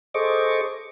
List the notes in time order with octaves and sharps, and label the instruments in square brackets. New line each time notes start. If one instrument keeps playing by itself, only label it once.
[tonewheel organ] G#4 A4 C5 D#5 C#6 D6